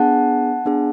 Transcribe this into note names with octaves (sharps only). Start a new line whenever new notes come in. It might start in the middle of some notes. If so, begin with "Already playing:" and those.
Already playing: B3 D4 G#4 F#5 A5
B3 D4 G#4